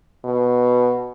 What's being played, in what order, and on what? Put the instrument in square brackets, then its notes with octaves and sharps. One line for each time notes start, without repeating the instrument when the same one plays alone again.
[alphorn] B2